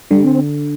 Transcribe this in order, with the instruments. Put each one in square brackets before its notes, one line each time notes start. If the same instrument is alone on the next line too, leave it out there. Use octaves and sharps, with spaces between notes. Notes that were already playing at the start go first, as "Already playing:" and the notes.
[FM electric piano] D3 [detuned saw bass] G3
[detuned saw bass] C4